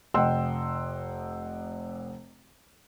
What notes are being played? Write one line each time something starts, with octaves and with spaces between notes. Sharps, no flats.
F1 D#5 F#5 G5 C6 E6